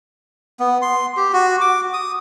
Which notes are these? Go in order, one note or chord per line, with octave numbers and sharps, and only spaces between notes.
B3
C6
G4
F#4
D6
D#6